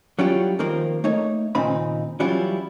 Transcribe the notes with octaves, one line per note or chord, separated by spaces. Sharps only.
F#3 G3 C#4 E4 F4 G4
D#3 F3 A#3 C4 A#4
A3 A#3 D#4 C#5
D#2 A#2 C#3 C4 D#4 B5
E3 F#3 G3 C#4 E4 F4